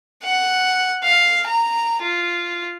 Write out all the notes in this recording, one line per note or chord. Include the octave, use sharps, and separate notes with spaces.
F#5
F5
A#5
F4